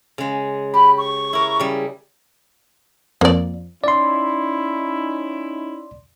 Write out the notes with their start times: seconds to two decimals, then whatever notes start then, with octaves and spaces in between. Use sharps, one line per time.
0.18 C#3 G#3
0.74 G4 B5
0.97 C#6
1.33 E4 A#4
1.60 C#3 G3
3.21 F2 A#3 D5
3.84 C#4 D#4 E4 D5 C6